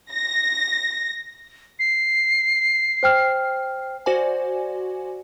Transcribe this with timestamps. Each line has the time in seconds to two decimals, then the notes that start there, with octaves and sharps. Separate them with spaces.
0.12 A#6
1.79 C7
3.03 C5 G5 F6
4.06 F#4 C5 D5 G#5